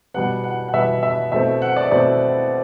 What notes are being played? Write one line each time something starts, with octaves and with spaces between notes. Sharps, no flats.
B2 G3 B3 F#5
F#5
F#5
B2 G3 B3 E5
E5
B2 A3 C4 E5
F#5
D5
B2 A3 C4 D5